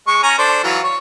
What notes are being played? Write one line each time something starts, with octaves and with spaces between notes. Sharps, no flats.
G#3 C#6
C#4 G#5 A#5
D4 A4 C5
E3 F#3 F4
C#5